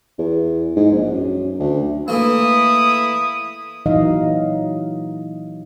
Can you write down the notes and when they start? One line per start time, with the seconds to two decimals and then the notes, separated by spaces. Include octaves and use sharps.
0.19 E2
0.76 G#2
0.92 A#1
1.12 F#2
1.59 D2
2.08 E3 A3 A#3 E4 D#6
3.86 A#2 E3 F#3 D#4 D#5 F5